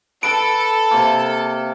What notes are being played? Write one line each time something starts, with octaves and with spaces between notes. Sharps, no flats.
A4 B4 D7
C3 A#3